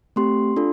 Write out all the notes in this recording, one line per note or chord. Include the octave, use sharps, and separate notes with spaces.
A3 C4 G4 C6
D4 F4 A4